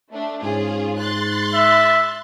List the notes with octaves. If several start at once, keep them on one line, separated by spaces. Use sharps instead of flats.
A3 D4
G#2 C#4 F4 G#4
C6 F#6 A6
E5